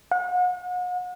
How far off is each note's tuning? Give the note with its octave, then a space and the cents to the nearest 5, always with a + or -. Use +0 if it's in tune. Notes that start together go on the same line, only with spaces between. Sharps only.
F#5 -40